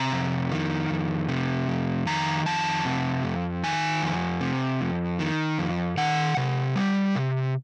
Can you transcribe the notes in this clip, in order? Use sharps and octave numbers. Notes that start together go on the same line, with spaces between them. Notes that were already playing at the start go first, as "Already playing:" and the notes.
Already playing: C3 A#5
F2
D#3
F2
C3
F2
D#3 A#5
F2 A5
C3
F2
D#3 G#5
F2
C3
F2
D#3
F2
D#3 F#5
C3
G3
C3